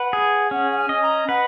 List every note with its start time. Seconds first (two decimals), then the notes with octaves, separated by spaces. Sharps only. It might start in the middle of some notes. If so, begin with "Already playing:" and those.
Already playing: B4 F#5
0.13 G#4
0.51 C#4 F#5
0.71 F#5
0.77 G#5
0.89 D#5
1.02 A#5
1.28 B4 F#5